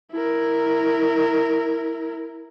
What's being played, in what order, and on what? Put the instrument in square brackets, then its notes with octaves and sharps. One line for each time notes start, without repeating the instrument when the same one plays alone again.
[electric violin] E4 A#4